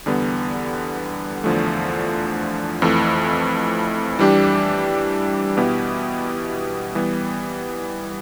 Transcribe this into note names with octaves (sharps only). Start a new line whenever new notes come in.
E2 D3 G3 B3
E2 D3 F3 A3
F2 E3 A3
E3 G3 D4 G4
B2 B3 E4 G4
E3 G3 B3